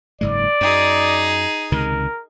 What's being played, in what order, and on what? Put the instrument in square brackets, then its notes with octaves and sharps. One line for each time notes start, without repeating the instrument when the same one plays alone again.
[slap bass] F#1 G#2 G#3 [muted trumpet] D5
[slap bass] F#2 [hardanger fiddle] D#4 G#4
[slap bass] C#2 C3 D#3 [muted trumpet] A#4